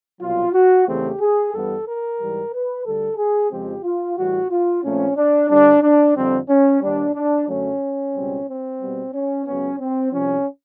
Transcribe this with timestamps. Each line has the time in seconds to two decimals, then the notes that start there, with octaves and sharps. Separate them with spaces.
0.20 C2 B2 F#3 F4
0.53 F#4
0.87 E2 C#3 E3 A3 C4 G4
1.20 G#4
1.52 G2 E3 G3 B3 A4
1.86 A#4
2.18 G#2 E3 G3
2.53 B4
2.85 D2 D3 G3 A4
3.18 G#4
3.51 F2 C#3 F3 G#3 C4 G4
3.84 F4
4.18 A2 E3 G3 F#4
4.50 F4
4.83 A#2 F3 A3 C4 C#4
5.17 D4
5.50 G2 D3 G3 D4
5.83 D4
6.15 F2 D3 G3 C4
6.49 C#4
6.82 D#2 D#3 G3 D4
7.15 D4
7.48 F#2 D3 F#3 A3 C#4
8.14 C#2 B2 G3 C4
8.48 C4
8.80 B2 G3 B3
9.13 C#4
9.46 C#2 C#3 F#3 B3 C#4
9.79 C4
10.12 C2 C3 F3 C#4